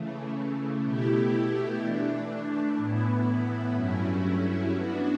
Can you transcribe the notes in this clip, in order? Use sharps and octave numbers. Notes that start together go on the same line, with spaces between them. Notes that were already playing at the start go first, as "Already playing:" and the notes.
Already playing: C#3 E3 A3
B2 A3 E4 G4
E3 A3 D4
A2 E3 B3 E4
G2 F#3 A3 C#4 E4
E3 B3 D4 F#4